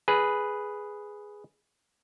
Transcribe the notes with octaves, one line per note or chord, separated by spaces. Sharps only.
G#4 B4